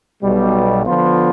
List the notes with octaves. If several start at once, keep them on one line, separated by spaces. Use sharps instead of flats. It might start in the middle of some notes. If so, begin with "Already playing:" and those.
B1 B2 G3
D3 F3 B3 F4